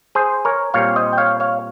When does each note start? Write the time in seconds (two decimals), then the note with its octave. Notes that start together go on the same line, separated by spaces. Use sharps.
0.15 G#4 C5
0.45 A#4 C#5
0.74 A#2 G3 C4 C#5 F5
0.96 C5 D#5
1.13 G5
1.18 C#5 F5
1.40 C#5 F5